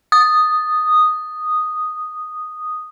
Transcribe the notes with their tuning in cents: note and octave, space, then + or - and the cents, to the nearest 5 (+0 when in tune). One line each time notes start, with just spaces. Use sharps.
D#6 -5